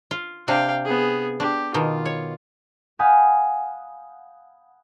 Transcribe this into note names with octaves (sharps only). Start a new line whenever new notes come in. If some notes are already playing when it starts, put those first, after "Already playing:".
F4
C3 D4 F5 G5
B3 G#4
D4 G4
B2 D#3 F4
C#5
F5 F#5 G#5 B5 D#6 G6